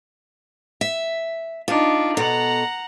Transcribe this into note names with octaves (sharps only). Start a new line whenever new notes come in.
E5
D4 D#4 F4
B2 A4 F#5 A#5